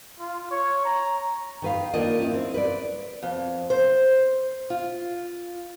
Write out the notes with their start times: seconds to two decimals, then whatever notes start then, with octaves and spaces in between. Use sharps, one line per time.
0.20 F4
0.51 C#5
0.85 A#5
1.62 D#3 B4 F5
1.94 D#3 A#3 D4 F4 A#4 D#5
2.19 C#4 E4
2.33 C4
2.54 B4 C5 D5
3.23 F2
3.70 C5
4.70 F4